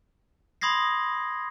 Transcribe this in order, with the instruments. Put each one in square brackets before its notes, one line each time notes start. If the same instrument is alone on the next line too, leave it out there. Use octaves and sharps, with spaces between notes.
[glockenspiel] B5 C6 D#6 G#6 A#6 C7